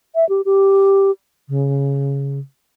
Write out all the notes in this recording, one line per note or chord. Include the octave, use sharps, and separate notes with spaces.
E5
G4
G4
C#3